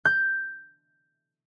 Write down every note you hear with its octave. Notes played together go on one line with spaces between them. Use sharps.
G6